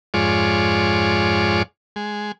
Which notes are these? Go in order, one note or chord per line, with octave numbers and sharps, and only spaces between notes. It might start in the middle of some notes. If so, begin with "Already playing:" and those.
F2 G#2 G#3 F4 C#5 D5
G#3